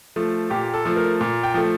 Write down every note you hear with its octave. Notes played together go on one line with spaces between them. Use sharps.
F3 A3
A#2 G4
A4
F3 A3
A#4
A#2
G5
F3 A3